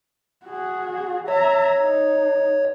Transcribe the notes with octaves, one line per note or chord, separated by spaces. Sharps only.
F#4 G#4
C#5 E5 A#5
D#4